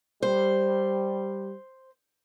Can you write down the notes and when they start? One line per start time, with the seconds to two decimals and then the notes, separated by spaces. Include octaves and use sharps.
0.22 G3 C5